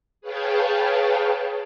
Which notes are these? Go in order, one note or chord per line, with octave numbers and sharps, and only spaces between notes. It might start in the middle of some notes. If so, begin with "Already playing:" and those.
G#4 B4 C#5 F5 G5 A5